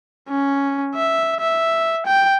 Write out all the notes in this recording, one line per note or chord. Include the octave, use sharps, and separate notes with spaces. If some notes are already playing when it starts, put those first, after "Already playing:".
C#4
E5
E5
G5